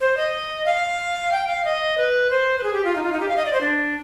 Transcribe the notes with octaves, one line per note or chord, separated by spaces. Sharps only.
C5
D#5
F5
G5
F5
D#5
B4
C5
B4
G#4
G4
F4
D#4
F4
D#4
G4
F5
D#5
D5
C5
D4